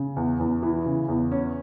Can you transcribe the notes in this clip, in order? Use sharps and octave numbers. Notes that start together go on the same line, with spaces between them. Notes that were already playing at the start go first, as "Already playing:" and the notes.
Already playing: C#3
E2
E2
E3
C#3
E2
C#4